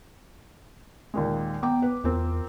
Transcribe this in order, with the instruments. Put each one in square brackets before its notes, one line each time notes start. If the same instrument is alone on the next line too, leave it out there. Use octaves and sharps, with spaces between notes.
[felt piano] D#2 A#2 G#3
[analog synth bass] B3 [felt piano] G5 A#5 D6
[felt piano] B4
[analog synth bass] E2 [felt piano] C4 F4 A#4